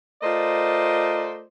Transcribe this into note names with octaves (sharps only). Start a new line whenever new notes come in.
A3 F4 A#4 C5 D5 D#5